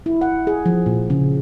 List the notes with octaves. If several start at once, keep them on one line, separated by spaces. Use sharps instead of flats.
E4
F#5
G#4
F3
A#2
C#3